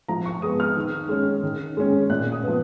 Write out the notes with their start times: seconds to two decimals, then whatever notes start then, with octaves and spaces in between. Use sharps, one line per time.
0.08 F3 A#5
0.26 C#6
0.42 G#3 B3 D#6
0.60 F6
0.76 D#3
1.09 G#3 C#4
1.43 D#3
1.77 G#3 C#4
2.10 A#2 F#6
2.32 D#6
2.44 F3 B3